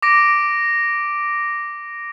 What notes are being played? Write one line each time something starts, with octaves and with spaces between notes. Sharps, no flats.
D6 A#6 D7